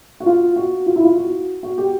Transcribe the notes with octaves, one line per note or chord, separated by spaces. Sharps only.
F#4
F4
F#4
F4
E4
F4
F#4
F#4
G4